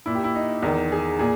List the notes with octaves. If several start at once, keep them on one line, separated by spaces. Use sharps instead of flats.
A#2 E4
G4
E4
D#4
E2 D#3 A#4
G#4
A#2 G#4